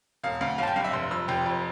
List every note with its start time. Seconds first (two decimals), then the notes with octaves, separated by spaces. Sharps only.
0.23 E1 F5
0.41 D2 F5
0.58 G1 F5
0.63 A5
0.67 G5
0.76 G2 F5
0.84 E5
0.93 F1 C6
1.11 F2 E6
1.28 F1 G5
1.46 F2